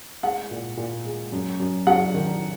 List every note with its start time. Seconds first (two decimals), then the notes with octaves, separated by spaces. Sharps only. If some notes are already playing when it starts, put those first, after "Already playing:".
0.23 G#3 F#5
0.51 A#2
0.77 A#2
1.05 G#3
1.32 F#2
1.60 F#2
1.87 F#3 F#5
2.14 D#3